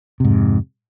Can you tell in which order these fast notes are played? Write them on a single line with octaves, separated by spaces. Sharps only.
C3 G#2 F2